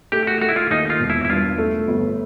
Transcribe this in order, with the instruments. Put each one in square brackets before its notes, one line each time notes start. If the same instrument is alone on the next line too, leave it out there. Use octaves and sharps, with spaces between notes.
[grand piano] A3 [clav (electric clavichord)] G4
[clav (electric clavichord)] F#4
[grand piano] A3 [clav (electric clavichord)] F#4
[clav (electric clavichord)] E4
F4
[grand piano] D#2 [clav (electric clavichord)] D#4
[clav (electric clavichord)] F4
[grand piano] E1
[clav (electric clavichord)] E4
E4
[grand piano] G2 [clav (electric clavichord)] F4
[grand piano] A3
G1